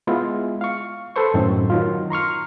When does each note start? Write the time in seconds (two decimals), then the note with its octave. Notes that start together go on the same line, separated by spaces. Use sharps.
0.07 G#3 B3 E4 F4
0.61 F5 C#6
1.16 A4 B4 C5 C#6
1.34 F#2 A2 D#3 C4
1.70 D#3 F#3 F4
2.10 A#5 C6 C#6 F6